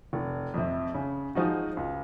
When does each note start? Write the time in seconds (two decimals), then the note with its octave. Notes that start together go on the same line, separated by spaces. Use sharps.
0.13 F1
0.54 F2 C3
0.95 C#3
1.35 F3 G#3 D#4 F#4
1.77 C#2